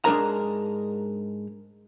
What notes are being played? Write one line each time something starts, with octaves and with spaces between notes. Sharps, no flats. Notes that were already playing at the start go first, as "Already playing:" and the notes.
G#2 G#3 D4 A#4 A#5